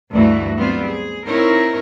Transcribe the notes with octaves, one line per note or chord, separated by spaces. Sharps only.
D2 G2 E3 A3 F#4
F#3 G3 B3 C4 F4
G#4
C4 D#4 E4 A#4 C#5